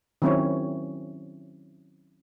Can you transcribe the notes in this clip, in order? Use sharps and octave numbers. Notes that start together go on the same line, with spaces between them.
D#3 F#3 C4 C#4 E4 C#5